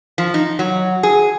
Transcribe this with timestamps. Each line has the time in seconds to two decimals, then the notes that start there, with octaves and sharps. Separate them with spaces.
0.18 F3
0.34 D#4
0.59 F#3
1.03 G#4